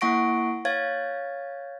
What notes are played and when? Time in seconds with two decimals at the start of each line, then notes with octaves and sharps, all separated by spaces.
0.01 A#3 E4 F#5 C#6 A#6 D7
0.65 C#5 F5 G#6 A6